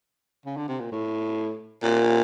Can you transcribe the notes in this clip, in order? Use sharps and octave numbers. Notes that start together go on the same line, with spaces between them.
C#3
D3
C3
A#2
A2
A#2